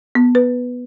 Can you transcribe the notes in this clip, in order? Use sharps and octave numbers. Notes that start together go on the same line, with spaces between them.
B3
B4